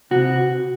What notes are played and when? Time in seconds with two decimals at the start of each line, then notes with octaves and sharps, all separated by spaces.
0.11 C3 F#4